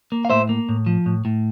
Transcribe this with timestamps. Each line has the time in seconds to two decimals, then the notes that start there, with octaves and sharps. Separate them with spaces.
0.12 A#3
0.25 F5
0.30 A2 C5 E5
0.49 A#3
0.69 A2
0.86 F3
1.06 A2
1.25 A2